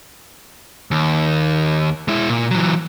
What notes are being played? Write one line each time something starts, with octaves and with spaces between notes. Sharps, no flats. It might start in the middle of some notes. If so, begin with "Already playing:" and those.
D#2
G#3 E4
A#2
E3 F#3